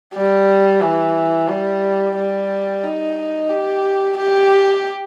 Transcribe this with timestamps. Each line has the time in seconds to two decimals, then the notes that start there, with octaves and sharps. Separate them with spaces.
0.14 G3
0.81 E3
1.48 G3
2.16 G3
2.83 D#4
3.50 G4
4.17 G4